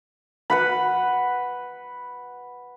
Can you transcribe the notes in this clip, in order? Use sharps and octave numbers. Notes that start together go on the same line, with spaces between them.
B4 F#5 B5